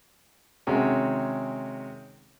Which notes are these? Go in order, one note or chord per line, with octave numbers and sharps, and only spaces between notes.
C3 D#3 G#3 C#4 F#4